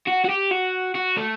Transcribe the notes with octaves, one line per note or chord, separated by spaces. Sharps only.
F#4
F#4
G4
F#4
F#4
A3